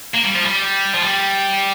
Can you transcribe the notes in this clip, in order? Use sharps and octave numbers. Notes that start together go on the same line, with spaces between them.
A#3
G3
F3
G3
F3
G3